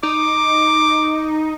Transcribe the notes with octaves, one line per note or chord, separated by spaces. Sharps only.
D#4 D6